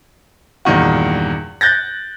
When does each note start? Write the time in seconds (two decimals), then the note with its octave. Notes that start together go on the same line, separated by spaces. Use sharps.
0.65 E2 G2 A#2 D#3 F#4
1.61 F#6 G6 A6 A#6